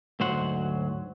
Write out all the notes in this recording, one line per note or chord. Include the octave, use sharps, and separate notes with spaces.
D2 G#2 F#3 C5 F#5